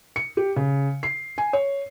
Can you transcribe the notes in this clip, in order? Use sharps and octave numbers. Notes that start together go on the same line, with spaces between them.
C#7
G4
C#3
C7
G#5
C#5